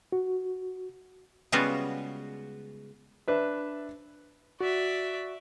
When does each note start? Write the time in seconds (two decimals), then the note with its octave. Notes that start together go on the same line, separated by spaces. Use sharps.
0.12 F#4
1.52 C#3 G3 G#3 B3 F4 F#4
3.28 D4 B4 E5
4.60 F#4 D5 E5